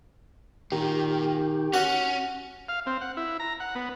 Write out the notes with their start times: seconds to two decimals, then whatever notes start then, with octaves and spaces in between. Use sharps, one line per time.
0.72 A#2 D#3 G4
1.74 C#4 F#4
2.69 F5
2.86 C4
3.01 F#5
3.17 E4
3.40 A#5
3.60 F#5
3.75 B3